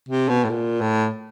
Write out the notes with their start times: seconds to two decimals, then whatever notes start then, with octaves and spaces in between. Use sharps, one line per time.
0.08 C3
0.29 B2
0.44 A2
0.49 A#2
0.81 A2